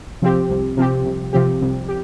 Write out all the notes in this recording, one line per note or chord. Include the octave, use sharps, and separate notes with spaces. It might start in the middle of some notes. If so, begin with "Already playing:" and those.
C3 F3 C4 G4
C2
C3 F3 C4 G4
C2
C3 F3 C4 G4
C2
G4